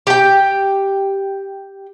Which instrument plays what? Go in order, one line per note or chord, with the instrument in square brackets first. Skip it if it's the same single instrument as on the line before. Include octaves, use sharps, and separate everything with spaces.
[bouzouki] G4 G5